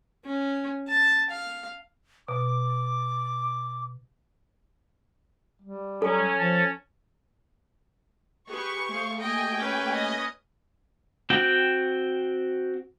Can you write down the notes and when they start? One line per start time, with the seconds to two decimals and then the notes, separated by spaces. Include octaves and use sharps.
0.25 C#4
0.89 A5
1.30 F5
2.28 B2 D6
5.62 G3
6.02 F#3 C#4 A4
6.37 F3 A5
8.49 G4 G#4 B4 C#6
8.89 A3 G#4 C5 F5
9.20 A#3 G4 D#5 G5 G#5
9.58 C#4 B4
9.93 D#5
11.30 C4 F#4 G5